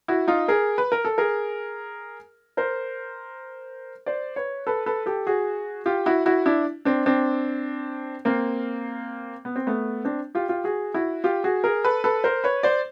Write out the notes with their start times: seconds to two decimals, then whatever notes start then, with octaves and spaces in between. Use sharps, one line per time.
0.08 E4 F#4
0.28 D#4 F4
0.48 G#4 A#4
0.78 B4
0.92 A#4
1.05 A4
1.18 G#4 A#4
2.57 A#4 C5
4.06 C5 D5
4.36 B4 C#5
4.67 A4 B4
4.86 A4 B4
5.06 G4 A4
5.27 F#4 G#4
5.86 F4 G4
6.06 E4 F#4
6.26 E4 F#4
6.46 D4 E4
6.85 C4 D4
7.06 C4 D4
8.25 A#3 C4
9.45 B3
9.56 C4
9.67 A3 B3
10.05 C4 D4
10.35 F4 G4
10.49 F4 G4
10.64 F#4 G#4
10.94 E4 F#4
11.24 F4 G4
11.44 F#4 G#4
11.64 G#4 A#4
11.84 A4 B4
12.04 A4 B4
12.24 A#4 C5
12.44 B4 C#5
12.63 C5 D5